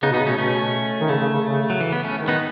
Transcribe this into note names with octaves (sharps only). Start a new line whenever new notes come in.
C#3 B3 D#4
B2
B3 D#4
C#3
B2 A3 C#4
B2 A3 C#4
D#3
C#3 A3
C#3
C#3
C#3
F#3
E3
B3
A3 C#4
D#3
B3 D#4